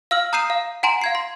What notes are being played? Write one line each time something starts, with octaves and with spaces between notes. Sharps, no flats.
F5 E6 F6 F#7
A#5 D#6 G6 C7 D#7 E7
F5
F#5 G#5 A#5 C6 D7
F5 G#6 C7
C6